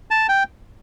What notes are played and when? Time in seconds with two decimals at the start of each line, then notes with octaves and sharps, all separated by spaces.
0.11 A5
0.29 G5